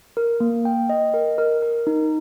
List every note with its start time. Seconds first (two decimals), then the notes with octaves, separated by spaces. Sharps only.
0.17 A#4
0.40 A#3
0.65 G5
0.90 D#5
1.14 A#4
1.38 A#4
1.62 A#4
1.87 D#4